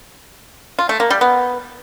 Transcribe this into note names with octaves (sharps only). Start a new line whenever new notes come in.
F4
A3
A#3
G3
B3